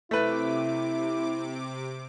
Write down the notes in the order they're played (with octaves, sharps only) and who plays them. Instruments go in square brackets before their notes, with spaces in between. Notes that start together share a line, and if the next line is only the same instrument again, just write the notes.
[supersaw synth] C3 D6 [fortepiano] A3 B4 [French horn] E4